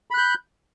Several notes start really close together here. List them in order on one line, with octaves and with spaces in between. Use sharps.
B5 F#6 G6